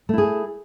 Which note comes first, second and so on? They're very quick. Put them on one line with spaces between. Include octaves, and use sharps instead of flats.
A3 E4 G#4